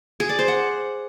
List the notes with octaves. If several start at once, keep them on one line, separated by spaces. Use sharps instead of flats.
G#4
D5
C5
F#5